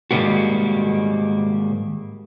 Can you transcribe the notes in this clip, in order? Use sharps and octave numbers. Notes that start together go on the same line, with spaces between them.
G#2 D#3 E3 G3 A#3 F#4